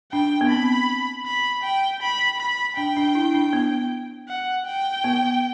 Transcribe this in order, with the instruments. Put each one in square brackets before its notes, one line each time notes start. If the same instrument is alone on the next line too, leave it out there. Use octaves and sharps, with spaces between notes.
[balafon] D4 [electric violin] G5
[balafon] B3
[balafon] C4 [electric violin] B5
[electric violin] B5
G5
B5
B5
[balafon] D4 [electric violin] G5
[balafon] D4
E4
D4
B3
[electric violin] F#5
G5
[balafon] B3